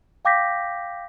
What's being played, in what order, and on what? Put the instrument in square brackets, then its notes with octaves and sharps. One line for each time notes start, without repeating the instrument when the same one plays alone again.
[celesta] F5 G5 D6 G6 A#6 B6